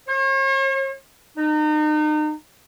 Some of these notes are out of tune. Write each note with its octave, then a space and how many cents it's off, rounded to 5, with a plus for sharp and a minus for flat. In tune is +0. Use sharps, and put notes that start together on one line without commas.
C#5 -45
D#4 -35